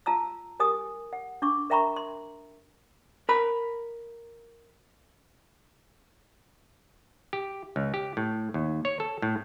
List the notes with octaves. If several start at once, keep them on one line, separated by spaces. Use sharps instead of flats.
F4 A5 A#5 E6
G4 A#4 G#5 D#6
F#5
D4 C#6 D6
A#4 E5 G5 A#5 B5 C#6
C6
A#4 B5
G4
C#2
G4
A2
D#2
C#5
A4
A2